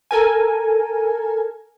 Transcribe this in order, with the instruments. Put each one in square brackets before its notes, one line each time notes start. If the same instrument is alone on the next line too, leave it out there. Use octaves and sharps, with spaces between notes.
[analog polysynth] A4 A#4 G#5